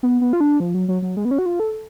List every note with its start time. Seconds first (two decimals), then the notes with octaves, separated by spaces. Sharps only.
0.03 B3
0.21 B3
0.33 F4
0.40 D4
0.60 F3
0.74 F#3
0.88 F#3
1.02 F#3
1.17 G#3
1.25 B3
1.31 C#4
1.38 F#4
1.46 F4
1.60 A4